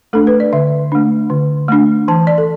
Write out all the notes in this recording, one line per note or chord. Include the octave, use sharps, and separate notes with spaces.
A3 D4 A4
B4
D5
D3 E5
A3 D4
D3
A3 D4
E3 A5
D5
A4